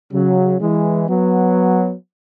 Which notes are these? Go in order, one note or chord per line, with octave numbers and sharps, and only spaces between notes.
C#3 F#3
E3 G#3
F#3 B3